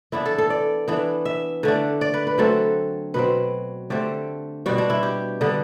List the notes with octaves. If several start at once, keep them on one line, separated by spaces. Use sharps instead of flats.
E3 B3 D4 E4
A4
A4
D5
E3 B3 D4
E5
D3 A3 D4
D5
B4
B4
D3 F#3 A3 C4 A4
B2 F#3 C4 B4
D3 A3 C4 G4
B2 G3 C4 F#4
D4
E4
G4
D3 G3 B3 D4